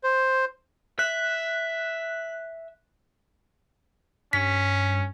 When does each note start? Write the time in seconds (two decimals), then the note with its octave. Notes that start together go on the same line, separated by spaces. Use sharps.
0.04 C5
0.99 E5 F#6
4.33 G2 C#4 B6